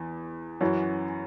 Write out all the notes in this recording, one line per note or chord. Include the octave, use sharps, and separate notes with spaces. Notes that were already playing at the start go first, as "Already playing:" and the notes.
Already playing: E2 E3
F#2 E3 C#4 F#4